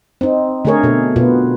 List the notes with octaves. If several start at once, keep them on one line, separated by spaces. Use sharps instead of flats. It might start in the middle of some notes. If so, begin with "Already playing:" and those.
C4 D#4
D3 A3 D4 G#4 A#4 C#5
B2 A4
B2 B3 F4